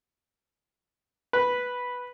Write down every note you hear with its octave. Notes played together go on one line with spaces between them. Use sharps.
B4